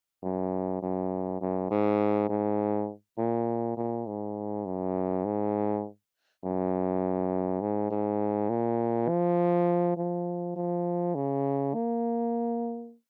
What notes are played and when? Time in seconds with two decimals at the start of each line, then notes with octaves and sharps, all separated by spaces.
0.23 F#2
0.82 F#2
1.41 F#2
1.71 G#2
2.29 G#2
3.18 A#2
3.77 A#2
4.07 G#2
4.66 F#2
5.25 G#2
6.44 F#2
7.61 G#2
7.90 G#2
8.49 A#2
9.09 F3
9.97 F3
10.56 F3
11.15 C#3
11.74 A#3